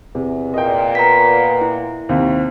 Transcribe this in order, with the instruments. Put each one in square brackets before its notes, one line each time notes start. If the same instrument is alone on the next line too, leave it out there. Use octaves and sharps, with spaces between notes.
[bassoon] E2 [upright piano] C3
[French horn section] A#2 [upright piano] D#5 G5
[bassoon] B3 [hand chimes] A#5 B6
[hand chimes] E4
[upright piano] D#2 C3 [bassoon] C4